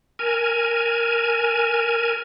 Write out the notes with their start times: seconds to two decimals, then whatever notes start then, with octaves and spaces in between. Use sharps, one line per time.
0.19 A#4 G#5